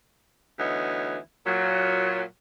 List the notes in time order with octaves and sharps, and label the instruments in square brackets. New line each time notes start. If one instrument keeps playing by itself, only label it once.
[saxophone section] D2 E3 B3 D#4 C#5
A#2 F#3